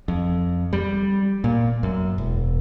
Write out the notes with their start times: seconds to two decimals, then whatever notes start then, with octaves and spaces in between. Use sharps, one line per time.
0.08 F2
0.73 G3
1.44 A#2
1.83 F#2
2.18 E1